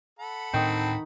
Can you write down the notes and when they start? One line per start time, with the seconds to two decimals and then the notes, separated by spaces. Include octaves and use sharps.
0.19 A4 F#5 B5
0.54 D2 A2 D#3 C4 D4 D#4